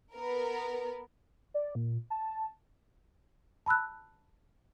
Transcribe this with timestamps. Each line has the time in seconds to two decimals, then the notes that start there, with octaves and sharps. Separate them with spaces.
0.14 B3 A#4
1.54 D5
1.75 A#2
2.10 A5
3.66 A5 B5 E6 F#6